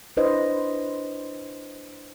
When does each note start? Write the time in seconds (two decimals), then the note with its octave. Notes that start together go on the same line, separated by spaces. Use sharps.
0.17 D4 E4 B4 C5 D#5